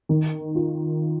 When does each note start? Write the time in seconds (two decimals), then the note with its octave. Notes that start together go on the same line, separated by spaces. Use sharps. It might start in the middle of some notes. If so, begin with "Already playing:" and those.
0.09 D#3
0.55 F4